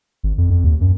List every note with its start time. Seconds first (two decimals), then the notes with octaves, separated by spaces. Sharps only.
0.24 G#1
0.38 F2
0.50 F2
0.64 D#2
0.81 F#2